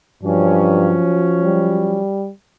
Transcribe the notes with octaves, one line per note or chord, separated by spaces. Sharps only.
G2 F3 F#3 C#4
G3